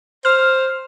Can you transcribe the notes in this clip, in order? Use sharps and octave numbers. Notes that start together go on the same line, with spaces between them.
C5 F6